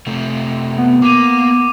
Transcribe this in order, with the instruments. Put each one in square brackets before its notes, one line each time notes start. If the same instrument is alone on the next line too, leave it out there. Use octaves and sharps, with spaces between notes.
[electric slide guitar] C3 A3
[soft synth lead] B3
[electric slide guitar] A#3 [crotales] D6 D#7